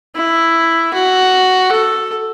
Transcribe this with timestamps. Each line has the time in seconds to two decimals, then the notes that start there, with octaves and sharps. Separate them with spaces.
0.15 E4
0.94 F#4
1.72 A4